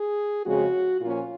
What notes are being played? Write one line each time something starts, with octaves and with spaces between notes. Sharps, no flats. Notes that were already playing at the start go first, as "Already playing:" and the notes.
Already playing: G#4
F2 C#3 G#3 C#4 F#4
A#2 F3 A#3 C#4 F4